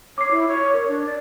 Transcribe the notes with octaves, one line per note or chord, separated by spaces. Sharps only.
C#5 D6 C7
E4
C#5
A#4 C#5
D4
D5